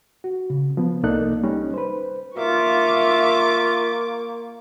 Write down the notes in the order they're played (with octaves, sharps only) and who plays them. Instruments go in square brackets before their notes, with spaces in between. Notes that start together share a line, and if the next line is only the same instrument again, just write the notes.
[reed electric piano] F#4
C#3
F3 B3
C2 A#3 D#4 A4 D5 F#6
G3 C#4 D#4
B4 C5
[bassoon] A#3 [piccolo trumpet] F4 [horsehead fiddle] E5 F5 [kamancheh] C#6 D6